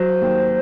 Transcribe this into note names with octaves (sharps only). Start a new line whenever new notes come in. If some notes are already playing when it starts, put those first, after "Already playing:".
Already playing: F#3 C5
D#2